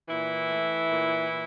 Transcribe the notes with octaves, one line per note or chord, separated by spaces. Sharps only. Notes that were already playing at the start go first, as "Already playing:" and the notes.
A#2 E3 E4
A3
A#2
A#2